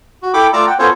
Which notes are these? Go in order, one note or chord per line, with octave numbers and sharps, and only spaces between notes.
F#4
E4 A4 G5 B5 D6
A3 F4 D5 A#5 D6 E6
F#5 G5
B3 C#4 F4 A4 C5 C#5